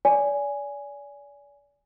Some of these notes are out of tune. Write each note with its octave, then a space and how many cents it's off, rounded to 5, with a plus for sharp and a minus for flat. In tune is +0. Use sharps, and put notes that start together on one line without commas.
D5 -35 G#5 +0